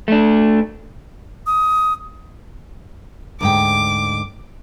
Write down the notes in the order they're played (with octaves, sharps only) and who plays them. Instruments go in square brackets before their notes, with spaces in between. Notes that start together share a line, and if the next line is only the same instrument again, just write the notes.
[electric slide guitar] A3 D4
[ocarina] D#6
[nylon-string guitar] D2 G#2 G5 [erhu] D6